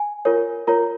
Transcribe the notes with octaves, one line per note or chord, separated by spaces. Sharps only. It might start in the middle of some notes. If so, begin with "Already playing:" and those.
Already playing: G#5
F4 A#4 C#5
F4 A#4 C#5 A#5